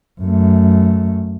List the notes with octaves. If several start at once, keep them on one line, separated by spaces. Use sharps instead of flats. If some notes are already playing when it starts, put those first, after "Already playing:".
F#2 A3